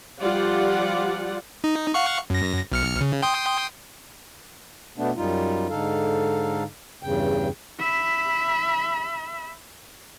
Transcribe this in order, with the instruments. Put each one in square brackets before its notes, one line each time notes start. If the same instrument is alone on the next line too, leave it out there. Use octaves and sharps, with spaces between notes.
[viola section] F3 G3 F4 G4 D5 F#5
[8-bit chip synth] D#4
F5 F#5 C#6
F#2 A#6
B1 F6 C#7
C#3
G5 C6 D#6
[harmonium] B2 A3 B3 D4
F#2 G3 D#4 F4
G#2 D3 D#4 A4 F5
E2 G2 C#3 G5
[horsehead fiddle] E5 B5